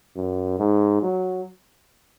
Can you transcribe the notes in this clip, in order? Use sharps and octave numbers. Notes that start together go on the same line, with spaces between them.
F#2
G#2
F#3